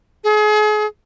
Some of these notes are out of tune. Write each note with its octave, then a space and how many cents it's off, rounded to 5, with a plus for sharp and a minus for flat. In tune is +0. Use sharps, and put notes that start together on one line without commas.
G#4 +35